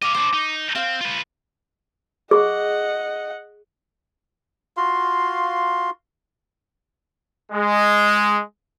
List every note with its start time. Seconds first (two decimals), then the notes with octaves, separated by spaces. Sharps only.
0.02 D#5 F5 D6
0.15 D4 C5 D6
0.33 D#4
0.75 C4 F5
1.01 F4 B4
2.31 G#4 D#5 F#5 C#6
4.77 F4 F#4 F5 C6
7.52 G#3